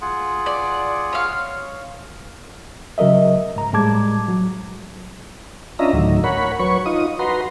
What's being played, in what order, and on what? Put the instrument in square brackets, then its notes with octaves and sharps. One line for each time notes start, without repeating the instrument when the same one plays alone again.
[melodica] F4 G#4 F#5
[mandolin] D5
C#5 F5
[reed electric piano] C#3 F#3 A#4 D#5 E5
G#2 A#5
A2 G3 G#3 A5 D6 G#6
F#3
[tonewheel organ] C#4 D4 F4 D#5 E5 A#5
D2 A2 D#3 F#3
A#4 C#5 F#5 B5
F#3 B4 C#5 C#6
D#4 F4 D#6
F#4 B4 A#5 C6